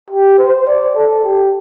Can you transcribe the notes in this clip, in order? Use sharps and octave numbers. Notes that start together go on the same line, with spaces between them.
G4
C5
D5
A4
G4